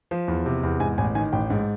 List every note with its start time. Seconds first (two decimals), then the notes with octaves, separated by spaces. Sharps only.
0.11 F3
0.28 E2
0.46 C3
0.63 E2
0.80 G#2 G#5
0.98 A1 G#5
1.15 D#3 G#5
1.33 A1 G5
1.50 G#2